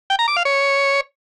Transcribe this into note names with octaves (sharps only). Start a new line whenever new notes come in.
G5
A#5
D6
F5
C#5